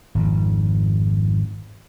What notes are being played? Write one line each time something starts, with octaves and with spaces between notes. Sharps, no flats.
G#1 F2